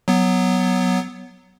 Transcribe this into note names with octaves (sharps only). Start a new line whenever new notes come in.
F#3 B3